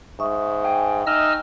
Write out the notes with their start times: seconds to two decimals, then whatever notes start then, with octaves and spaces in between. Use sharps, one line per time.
0.20 G#2 E5 C#6 D#6
0.64 F5 G5 G#5
1.07 D#4 D#5 E6 F6